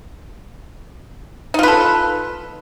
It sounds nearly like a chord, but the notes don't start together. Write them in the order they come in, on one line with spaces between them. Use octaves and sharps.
D#4 F4 B4 A4